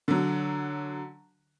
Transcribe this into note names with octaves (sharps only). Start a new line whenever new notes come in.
D3 F#3